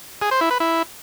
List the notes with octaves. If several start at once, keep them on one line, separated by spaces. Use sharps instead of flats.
G#4
C5
E4
B4
E4